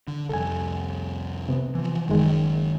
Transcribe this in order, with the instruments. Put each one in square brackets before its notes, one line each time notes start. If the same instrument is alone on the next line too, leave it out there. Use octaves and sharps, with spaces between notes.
[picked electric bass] D3
[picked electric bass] C2 F2 [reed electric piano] A4 G#5
[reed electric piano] C3 B3
[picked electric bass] E3 F3
[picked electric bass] F#1 F#3 [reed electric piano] F#2 D#3 G#3